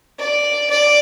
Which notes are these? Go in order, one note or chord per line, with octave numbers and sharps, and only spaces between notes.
D5
D5